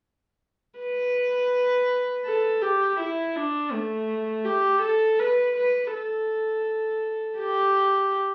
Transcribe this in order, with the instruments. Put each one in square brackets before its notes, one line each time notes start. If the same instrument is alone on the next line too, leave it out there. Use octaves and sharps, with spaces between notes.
[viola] B4
A4
G4
E4
D4
A3
G4
A4
B4
B4
A4
G4